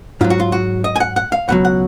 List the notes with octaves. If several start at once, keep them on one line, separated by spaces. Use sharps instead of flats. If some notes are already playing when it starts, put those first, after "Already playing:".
G#2 F#3 F4
F#4
F4
F#4
D#5
G#5
F#5
F#5
F5
C#2 B2 F#3 F#5
F#5